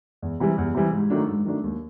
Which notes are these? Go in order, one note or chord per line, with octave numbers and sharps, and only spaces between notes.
E2
C3 E3 G3
E2
C3 E3 G3
G#2
D#3 F#3 A3 D4
G#2
D#3 F#3 A3 D4
D#2